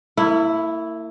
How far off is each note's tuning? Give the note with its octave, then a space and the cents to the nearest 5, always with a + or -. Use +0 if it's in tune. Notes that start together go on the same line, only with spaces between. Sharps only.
A#3 -45 E4 +0